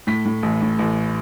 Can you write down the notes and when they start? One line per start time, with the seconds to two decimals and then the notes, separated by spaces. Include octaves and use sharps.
0.07 A2 B6
0.25 A2
0.43 A1
0.61 A2
0.79 A1